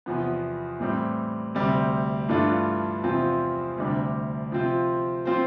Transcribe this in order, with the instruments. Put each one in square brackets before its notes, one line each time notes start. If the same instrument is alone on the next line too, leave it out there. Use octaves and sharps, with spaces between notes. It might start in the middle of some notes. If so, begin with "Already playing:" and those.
[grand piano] E2 C3 F3 B3
A2 E3 G3 C4
D2 C3 G3 C4
G2 E3 A3 D4 F4
E2 C3 F3 C4 F4
D2 C3 G3 D4
C3 F3 C4 F4
F3 C4 F4 C5